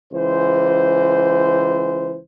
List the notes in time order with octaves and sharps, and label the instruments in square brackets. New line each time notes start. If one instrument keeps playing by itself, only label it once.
[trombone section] C#2 E3 C5